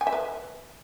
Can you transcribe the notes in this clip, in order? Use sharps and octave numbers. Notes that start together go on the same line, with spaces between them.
G#5
E5
B4